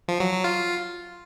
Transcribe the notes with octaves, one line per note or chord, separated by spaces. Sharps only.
F3
F#3
F#3
F4